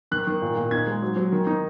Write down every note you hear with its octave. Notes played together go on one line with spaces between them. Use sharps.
D#3 F#6
D#3
A#2
A#2
D#4 G#6
G#3
F#3
F#3
D#3
D#4